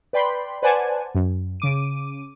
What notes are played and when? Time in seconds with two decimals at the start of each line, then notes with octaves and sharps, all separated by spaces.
0.13 B4 D5 G5 B5 C6
0.62 B4 C5 D5 F#5 G#5 A5
1.15 F#2
1.60 C#3 D6 D#7